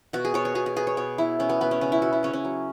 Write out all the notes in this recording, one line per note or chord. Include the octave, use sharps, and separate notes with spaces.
B2 F#4
G#4
B2 C#5
C#5
B2 G#4
G#4
B3 G#4
C#5
B2 C#5
B3 E4
B2 C#4
B3
B2 B3
C#4
C#3 C#4
E4
B3 F#4
E4
C#3 C#4
C#4
F#3